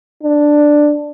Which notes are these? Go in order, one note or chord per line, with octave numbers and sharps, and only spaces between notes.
D4